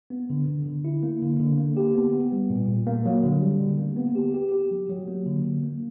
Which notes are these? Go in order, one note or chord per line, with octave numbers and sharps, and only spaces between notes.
B3
D3
D3
D3
E4
A#3
D3
D3
A#3
G4
B3
B3
G3
A#2
A#2
A#3
F#3
D3
G3
D3
A#3
B3
G4
G4
G4
F#3
F#3
A#3
D3
D3
A#3